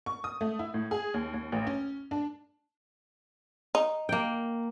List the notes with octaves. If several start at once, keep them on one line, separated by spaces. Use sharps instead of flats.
C#6
D#6
A3
E4
A2
G#4
D#2
D#2
A1
C#4
D4
D#4
A#3 G5